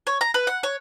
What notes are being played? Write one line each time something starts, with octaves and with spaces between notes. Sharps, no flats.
C#5
A#5
B4
F#5
C#5